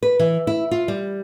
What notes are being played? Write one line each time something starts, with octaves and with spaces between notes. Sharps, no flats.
B4
E3
E4
F4
G3